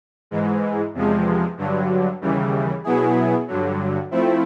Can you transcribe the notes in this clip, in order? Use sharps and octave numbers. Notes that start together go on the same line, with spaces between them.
G#2 E3 G#3
E2 C3 F3 G#3
G2 D3 F#3
D#2 C#3 E3 G3
B2 F#3 B3 E4 G#4
G2 D3 F#3
F3 A3 C4 E4